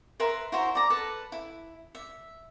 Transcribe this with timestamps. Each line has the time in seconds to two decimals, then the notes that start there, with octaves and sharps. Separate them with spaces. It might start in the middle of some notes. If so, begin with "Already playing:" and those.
0.20 A#4 B4 E5 C6
0.52 E4 F#4 C5 A#5
0.75 D5 A#5
0.90 A4 B4 A5
1.32 E4
1.95 E5